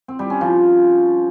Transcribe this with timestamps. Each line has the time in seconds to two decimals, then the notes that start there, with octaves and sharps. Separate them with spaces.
0.08 C4
0.19 G3
0.30 C#4
0.41 F3